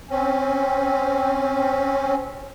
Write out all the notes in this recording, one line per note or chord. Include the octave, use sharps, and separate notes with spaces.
C4 C#4